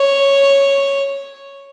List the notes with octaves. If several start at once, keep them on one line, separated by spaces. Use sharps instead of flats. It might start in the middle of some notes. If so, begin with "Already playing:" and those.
Already playing: C#5